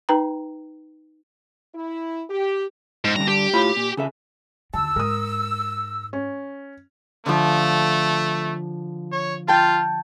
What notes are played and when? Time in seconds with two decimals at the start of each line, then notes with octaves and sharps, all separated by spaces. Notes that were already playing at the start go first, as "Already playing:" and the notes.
0.09 D#4 B4 G5 A#5
1.74 E4
2.29 G4
3.05 G#2
3.16 G2 D3 D4 A#5
3.28 G4
3.53 A2 F4 B5
3.77 A#2
3.97 C#3 A4 E5
4.74 D#2 D3 A5 E6
4.96 G#2 A#4 D#6
6.13 C#4
7.26 D3 F3 A3
9.12 C#5
9.48 F4 G5 A5